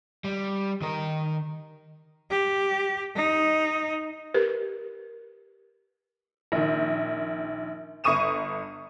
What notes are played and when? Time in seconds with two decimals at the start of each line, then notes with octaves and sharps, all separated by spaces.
0.24 G3
0.82 D#3 A#4
2.30 G4
3.15 D#4
4.34 G4 A#4 B4
6.52 A#1 D#3
8.04 G1 C#6 D#6 D#7 E7